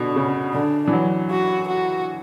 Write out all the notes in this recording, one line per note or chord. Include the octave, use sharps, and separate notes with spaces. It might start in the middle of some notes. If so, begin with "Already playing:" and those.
Already playing: B2 D3 D4
C#3
D3 D4
E3
F#3
F#4
F#4